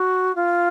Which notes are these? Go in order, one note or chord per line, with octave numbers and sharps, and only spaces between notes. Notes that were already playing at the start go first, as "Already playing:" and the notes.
Already playing: F#4
F4